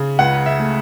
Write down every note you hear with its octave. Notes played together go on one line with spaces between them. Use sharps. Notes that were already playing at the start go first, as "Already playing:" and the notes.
Already playing: C#3
C#2 F#5
E5
A3